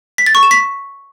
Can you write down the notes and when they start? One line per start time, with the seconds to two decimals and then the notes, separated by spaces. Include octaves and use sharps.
0.18 B6
0.26 A6
0.35 C#6
0.43 E7
0.51 B6